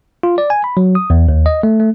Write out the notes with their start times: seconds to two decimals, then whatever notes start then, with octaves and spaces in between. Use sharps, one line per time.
0.23 F4
0.38 D5
0.50 G#5
0.64 B5
0.77 F#3
0.95 D#6
1.10 E2
1.28 D#2
1.46 D#5
1.63 A3
1.80 A3